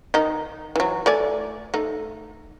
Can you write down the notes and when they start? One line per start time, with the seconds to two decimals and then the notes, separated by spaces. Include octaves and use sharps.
0.14 D#3 D#4
0.76 E3 F#3
1.06 A3 D5 G#5
1.74 A3 D#4